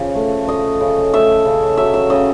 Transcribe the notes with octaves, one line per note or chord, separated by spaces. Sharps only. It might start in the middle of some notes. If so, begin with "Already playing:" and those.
Already playing: C#3 F3
A3
A3 D#5
C#3
A3 E5
C#3
F#3 E5
E5
C#3 D#5